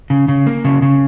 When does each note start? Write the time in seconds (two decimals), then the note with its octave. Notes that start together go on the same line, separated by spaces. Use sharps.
0.10 C#3
0.28 C#3
0.46 A#3
0.65 C#3
0.82 C#3